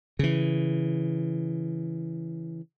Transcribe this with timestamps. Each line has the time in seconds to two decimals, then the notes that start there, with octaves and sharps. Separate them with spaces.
0.19 C#3 E3